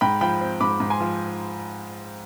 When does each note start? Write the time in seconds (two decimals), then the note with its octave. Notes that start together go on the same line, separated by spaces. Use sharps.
0.01 G#2 G5 B5
0.21 F3 G5 B5
0.41 C4
0.60 G#2 B5 D6
0.80 G#2
0.90 G#5 C6
1.01 F3